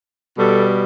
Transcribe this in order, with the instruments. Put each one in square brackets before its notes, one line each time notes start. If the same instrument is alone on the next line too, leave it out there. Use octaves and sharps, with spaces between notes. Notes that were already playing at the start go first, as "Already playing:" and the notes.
[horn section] B2 G3 A4